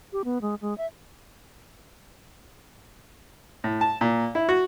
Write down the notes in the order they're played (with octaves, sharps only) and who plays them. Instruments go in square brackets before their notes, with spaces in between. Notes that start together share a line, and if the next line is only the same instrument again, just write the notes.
[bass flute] G4
B3
G#3
G#3
E5
[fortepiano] A2
A5
A#2
E4
F#4